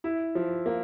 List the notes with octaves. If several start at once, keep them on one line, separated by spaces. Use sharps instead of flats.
E4
F3
A#3